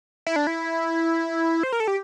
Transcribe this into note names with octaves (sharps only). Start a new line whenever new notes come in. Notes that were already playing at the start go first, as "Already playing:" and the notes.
E4
D4
E4
C5
A#4
A4
G4